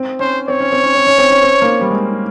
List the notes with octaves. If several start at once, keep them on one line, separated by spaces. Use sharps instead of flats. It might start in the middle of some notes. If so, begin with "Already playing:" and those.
Already playing: C4
C#4 C5
C4 C#5
C#4
C4
C#4
C4
C#4
C4
C#4
C4
A#3
G3
G#3